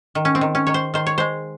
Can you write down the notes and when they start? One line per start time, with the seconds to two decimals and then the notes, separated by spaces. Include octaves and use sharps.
0.15 D#3
0.25 C#4
0.35 C4
0.41 D#3
0.55 C#4
0.67 D#3 C#5
0.74 C5
0.94 D#3 C5
1.06 C#5
1.18 G#3 C5